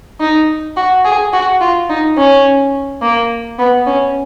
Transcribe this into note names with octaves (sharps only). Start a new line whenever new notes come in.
D#4
F#4
G#4
F#4
F4
D#4
C#4
A#3
B3
C#4